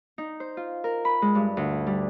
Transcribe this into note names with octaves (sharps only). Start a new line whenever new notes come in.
D#4
C5
F4
A#4
B5
G#3
G2
D2
G3